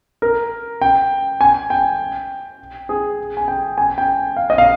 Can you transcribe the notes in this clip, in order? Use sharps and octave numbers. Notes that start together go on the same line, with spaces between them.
A#4
G5
G#5
G5
G#4
G#5
G5
G#5
G5
F5
D#5
F5